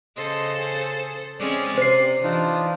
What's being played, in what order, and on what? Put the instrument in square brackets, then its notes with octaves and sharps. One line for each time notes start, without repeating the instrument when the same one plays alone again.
[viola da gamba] C#3 A4 C5 [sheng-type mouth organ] D#5 C6
[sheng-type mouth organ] G#4
[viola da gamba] G#3 C4 C#4 [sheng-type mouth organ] D5
[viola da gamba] C3 [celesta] C5 C7
[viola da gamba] E3 [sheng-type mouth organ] D4 D#4 F4